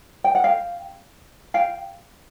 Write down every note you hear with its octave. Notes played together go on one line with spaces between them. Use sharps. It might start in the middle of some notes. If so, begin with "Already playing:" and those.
G5
F#5
F5 G5
F5 G5